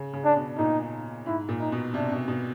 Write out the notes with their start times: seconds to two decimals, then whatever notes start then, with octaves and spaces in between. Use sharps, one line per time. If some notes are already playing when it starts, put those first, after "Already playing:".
Already playing: C#3
0.13 C#3
0.25 D4
0.36 B2
0.58 A#2 D#4
1.26 G#2 E4
1.49 A#2
1.60 D#4
1.72 B2
1.94 C3 D4
2.12 B2
2.28 B2